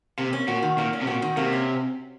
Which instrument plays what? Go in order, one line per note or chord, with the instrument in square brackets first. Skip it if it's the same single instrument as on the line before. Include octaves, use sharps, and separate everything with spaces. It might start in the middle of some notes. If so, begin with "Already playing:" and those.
[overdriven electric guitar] C3 [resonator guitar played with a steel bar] A#3
[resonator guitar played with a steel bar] C#4
[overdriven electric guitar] A#2 [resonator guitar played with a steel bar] F#4
[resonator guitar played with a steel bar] D#3
[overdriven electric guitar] A#2 [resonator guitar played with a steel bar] A#3
[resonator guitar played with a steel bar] C#4
[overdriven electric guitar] C3
[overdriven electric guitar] A#2 [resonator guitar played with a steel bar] F#4
[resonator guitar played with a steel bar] D#3
[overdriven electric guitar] C3 [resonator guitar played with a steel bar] A#3
[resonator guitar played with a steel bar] C#4